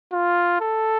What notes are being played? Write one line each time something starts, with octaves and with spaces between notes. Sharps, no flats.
F4
A4